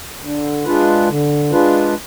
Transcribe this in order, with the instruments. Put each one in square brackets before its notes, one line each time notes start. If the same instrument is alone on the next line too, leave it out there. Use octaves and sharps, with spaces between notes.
[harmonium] D3
G#3 D4 F4 B4
D3
G#3 D4 F4 B4